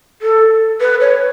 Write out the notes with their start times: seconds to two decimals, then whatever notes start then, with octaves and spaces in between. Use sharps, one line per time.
0.22 A4
0.81 B4
1.01 C#5